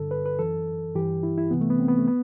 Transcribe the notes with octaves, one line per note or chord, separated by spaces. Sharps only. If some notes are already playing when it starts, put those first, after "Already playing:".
Already playing: G2 D3 A4
B4
B4
F#2 E3 A4
G2 E3 G4
E4
E4
C2 C3 E3 B3
A3
B3
C4
B3
A3
B3